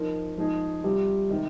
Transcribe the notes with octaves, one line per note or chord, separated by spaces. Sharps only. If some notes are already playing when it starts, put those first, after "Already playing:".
Already playing: F3 C4 D#4 A#4
F3 G#3 D#4 G#4
C3 G3 C4 F4
C3 D#3 G#3